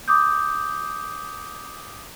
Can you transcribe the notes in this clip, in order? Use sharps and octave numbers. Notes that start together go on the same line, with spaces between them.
D6 D#6 G6